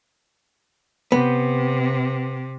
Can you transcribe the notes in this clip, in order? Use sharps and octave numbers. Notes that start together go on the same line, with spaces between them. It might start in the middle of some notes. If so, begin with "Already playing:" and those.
C3 B3